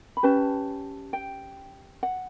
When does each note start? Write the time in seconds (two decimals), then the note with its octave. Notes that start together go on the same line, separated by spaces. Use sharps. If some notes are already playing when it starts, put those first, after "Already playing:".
0.17 B5
0.23 C#4 G4 B4 A5
1.13 G5
2.03 F#5